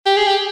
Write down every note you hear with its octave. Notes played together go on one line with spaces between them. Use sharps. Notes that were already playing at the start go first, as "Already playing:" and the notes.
G4
G#4
G4